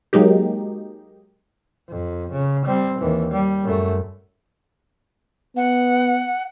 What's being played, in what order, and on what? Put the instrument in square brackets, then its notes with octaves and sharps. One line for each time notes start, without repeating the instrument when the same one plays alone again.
[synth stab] F#3 G#3 A#3 D#4 G4
[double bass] F2
C#3
G3 C4
D#2 E3
G3
F#2 A3
[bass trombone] B3 [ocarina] F#5